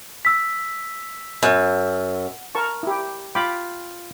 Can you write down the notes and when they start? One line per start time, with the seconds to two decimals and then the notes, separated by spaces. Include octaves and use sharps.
0.25 E6 B6
1.43 F#2
2.55 A#4 A5 C#6
2.83 E4 G4
3.35 F4 G5 B5 D6